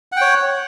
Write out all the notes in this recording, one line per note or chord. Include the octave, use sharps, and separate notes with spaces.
C#5 F#5 G5